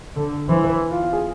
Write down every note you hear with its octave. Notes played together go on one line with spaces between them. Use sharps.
D3 A4
E3 C5
B4
F4
F4
G#4